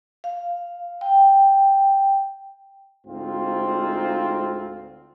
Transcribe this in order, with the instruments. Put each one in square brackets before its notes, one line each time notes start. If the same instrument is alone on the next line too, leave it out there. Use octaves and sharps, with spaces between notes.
[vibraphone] F5
G5
[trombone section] D2 G#2 C4 F4